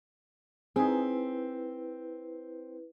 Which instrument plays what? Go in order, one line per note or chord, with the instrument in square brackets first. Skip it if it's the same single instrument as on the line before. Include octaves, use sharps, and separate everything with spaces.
[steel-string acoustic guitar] C4 [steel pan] D#4 G#4 [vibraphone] E4 B4